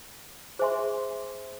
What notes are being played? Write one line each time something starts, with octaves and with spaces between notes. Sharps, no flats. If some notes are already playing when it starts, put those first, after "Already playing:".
G#4 C5 E5 G#5 C6